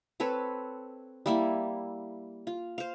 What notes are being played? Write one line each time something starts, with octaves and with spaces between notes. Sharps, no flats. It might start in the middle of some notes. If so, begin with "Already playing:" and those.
C4 A4 B4 C#5
G3 A#3 E4
F4
C5 F5